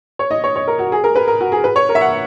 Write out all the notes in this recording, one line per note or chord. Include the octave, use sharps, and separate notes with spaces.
C#5
D#5
C#5
C#5
A#4
F#4
G#4
A#4
B4
A#4
F#4
G#4
B4
C#5
A#4
E5
F#5